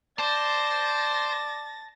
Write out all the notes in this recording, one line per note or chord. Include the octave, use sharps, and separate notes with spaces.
C5 D5 A5 A6 A#6